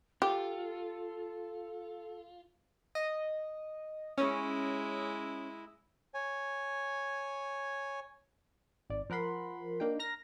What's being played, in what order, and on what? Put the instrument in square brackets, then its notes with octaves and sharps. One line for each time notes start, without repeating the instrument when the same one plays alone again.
[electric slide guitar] F4 [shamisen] G4 [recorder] A4
[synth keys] D#5
[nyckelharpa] G#3 E4 [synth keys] C#4
[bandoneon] C#5 G#5
[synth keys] G#1 D5
F3 A#4 F#5 B5 C6
A#3 D4 D#4 G5
A#5 F6 A#6